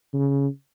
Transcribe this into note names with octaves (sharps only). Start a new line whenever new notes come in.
C#3